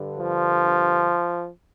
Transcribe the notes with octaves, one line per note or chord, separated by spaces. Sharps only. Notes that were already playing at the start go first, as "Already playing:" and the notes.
Already playing: G2 D3
F3